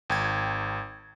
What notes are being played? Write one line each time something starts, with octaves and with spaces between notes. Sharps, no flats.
G#1 G5 G#6